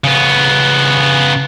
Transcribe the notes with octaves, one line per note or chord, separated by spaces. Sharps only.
C#3 B3